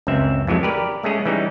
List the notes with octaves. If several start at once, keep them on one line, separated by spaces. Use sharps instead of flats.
C#2 F#2 C4 E5
F2 E3 F#3 G#3 A3
G4 A#4 B4 D5
G#3 A3 C#4 G#4
E3 G3 C#4 D#4